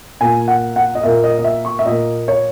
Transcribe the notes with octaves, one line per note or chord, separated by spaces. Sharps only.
A#2 A#3 G#5
F#5
F#5
D#5
A#2 A#3 E5
D#5
D#5
E5
C#6
E5
A#2 A#3 D#5
C#5